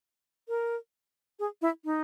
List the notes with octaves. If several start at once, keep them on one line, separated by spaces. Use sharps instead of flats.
A#4
G#4
E4
D#4